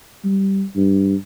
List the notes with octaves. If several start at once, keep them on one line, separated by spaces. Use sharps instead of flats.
G3
G2